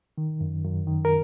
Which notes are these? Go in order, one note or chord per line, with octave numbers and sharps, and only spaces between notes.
D#3
F#2
F#2
D#3
A#4